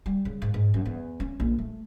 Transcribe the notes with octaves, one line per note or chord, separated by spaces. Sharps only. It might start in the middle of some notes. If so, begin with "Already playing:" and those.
G3
C#3
G#2
G#2
F#2
E2
C#4
A#1
A3